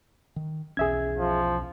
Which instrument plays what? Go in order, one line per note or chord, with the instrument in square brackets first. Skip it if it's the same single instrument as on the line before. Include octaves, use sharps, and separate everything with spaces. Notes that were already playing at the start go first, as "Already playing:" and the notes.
[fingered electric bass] D#3
[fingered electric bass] B1 E2 C#4 [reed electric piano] G#4 E5 G#6
[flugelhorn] F3